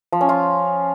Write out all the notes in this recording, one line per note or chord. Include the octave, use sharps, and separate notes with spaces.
F3
C#4
F4